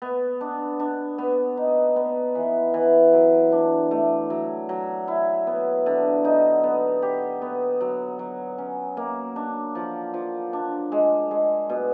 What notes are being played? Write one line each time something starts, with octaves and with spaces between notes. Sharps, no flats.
B3
D4
D4
B3
D#4
B3
E3
E3
F#3
D4
A3
F#3
F#3
E4
B3
D3
D#4
B3
G4
B3
F#3
F#3
C#4
A#3
D4
F3
F3
D4
G#3
G#3
B2